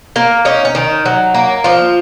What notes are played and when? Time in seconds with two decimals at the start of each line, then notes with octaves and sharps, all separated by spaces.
0.16 A#3 A#4
0.45 C#4 D#4
0.65 C#4
0.75 D#3 D#4
1.06 F#3
1.34 A#3
1.64 F3 F4